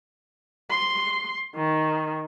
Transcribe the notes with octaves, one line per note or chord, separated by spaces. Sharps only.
C6
D#3